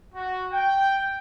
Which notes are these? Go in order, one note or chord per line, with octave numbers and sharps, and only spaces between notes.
F#4
G5